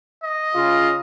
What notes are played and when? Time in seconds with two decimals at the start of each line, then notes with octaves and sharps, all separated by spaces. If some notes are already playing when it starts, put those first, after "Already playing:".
0.23 D#5
0.55 C#3 F4